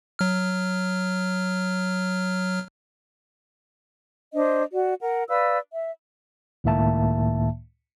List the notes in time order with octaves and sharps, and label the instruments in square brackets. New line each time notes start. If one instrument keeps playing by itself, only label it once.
[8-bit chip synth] F#3 F6
[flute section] D4 C5 D#5
F#4 D5
A#4 F#5
B4 D5 F5 E6
E5
[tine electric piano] C#2 A2 D#3 A#3 E5 A5